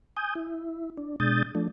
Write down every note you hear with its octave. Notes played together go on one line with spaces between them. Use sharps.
G#5 D#6 G6
E4
D4
B2 G#3 D4 D#6 G6 A6
F3 A3 D4